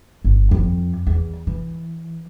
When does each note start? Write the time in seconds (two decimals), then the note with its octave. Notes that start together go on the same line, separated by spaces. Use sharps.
0.24 G1
0.51 F2
1.07 E2
1.47 E3